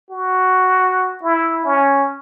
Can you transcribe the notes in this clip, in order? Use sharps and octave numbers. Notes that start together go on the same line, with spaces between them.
F#4
E4
C#4